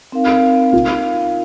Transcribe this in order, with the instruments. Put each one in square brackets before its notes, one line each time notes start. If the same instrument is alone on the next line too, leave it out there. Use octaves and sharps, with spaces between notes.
[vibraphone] C4 D#4 A#4 F5
[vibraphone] D#4 A#4 F5 [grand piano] F4